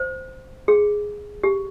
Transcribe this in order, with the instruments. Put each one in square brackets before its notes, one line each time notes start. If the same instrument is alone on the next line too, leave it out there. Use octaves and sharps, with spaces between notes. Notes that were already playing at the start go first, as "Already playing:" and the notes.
Already playing: [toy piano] C5
G#4
G4